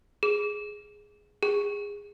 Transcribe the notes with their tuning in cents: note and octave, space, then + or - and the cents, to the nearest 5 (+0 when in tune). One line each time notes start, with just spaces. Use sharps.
G#4 +0
G#4 -20